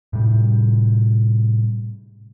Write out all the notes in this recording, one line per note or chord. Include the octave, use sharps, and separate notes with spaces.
A2 C3 G3